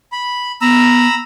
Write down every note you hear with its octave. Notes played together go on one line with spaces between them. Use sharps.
B5
B3 A#5 B5 E6